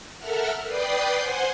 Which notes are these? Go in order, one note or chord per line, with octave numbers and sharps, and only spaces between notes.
A4 A#4 E5 F#5 F6
B4 D5 G5 D#6 C7
C5 F#5 G#5 C6